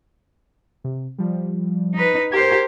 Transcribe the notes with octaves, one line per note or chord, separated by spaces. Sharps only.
C3
F3 G3
D#4 B4
G4 A#4 C5 A#5 G#6